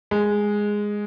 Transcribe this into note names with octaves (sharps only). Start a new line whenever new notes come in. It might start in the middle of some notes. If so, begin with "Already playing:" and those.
G#3